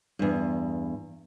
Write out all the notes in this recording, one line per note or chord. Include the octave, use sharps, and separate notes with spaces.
E2 G2